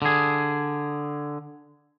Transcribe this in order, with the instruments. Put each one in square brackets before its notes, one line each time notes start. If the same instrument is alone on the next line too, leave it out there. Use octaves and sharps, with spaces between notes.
[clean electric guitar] D3 G#4